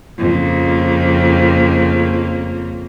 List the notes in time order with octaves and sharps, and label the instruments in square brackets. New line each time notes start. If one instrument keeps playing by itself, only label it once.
[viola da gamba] F2 C#3 A#3